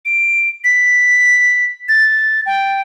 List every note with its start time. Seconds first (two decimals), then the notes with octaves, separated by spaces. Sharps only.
0.05 D7
0.64 B6
1.88 A6
2.46 G5